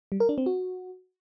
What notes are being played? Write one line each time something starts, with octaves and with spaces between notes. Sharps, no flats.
G3
A#4
D4
C4
F#4